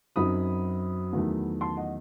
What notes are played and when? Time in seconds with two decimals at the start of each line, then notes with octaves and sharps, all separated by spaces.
0.16 F#2 F#3 C4 D#4 B5 D#6
1.13 E2 D#3 F#3 A3
1.61 A5 C6
1.77 D#5 F#5